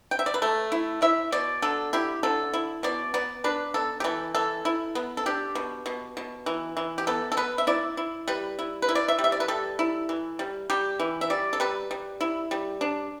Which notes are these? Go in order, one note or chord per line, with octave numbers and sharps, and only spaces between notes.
G5
E5
D5
B4
A3 A4
E4
E4 E5
B2 D5
D3 A4
E4 G4
D3 A4
E4
B2 D5
B3 D5
D4 B4
B3 A4
G4
E3 A4
E3 A4
E4
B3
A4
D4 G4
B2
B2
B2
E3
E3
G4
B3 A4
A4
B3 B4
E5
E4 D5
E4
G3 B4
E4
B4
E4
D5
E5
G3
E5
D5
B4
G3 A4
E4
E3
G3
G3 G4
E3
E5
G3 D5
A4
G3 B4
G3
E4
G3
D4